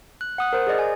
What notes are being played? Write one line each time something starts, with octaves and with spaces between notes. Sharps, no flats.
F#6
F#5 D#6 F#6
A#4 C5
G#4 D5 D#5
G#5